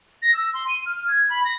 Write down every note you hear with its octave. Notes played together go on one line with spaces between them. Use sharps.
A#6
E6
C6
D#7
F6
G#6
B5
A#6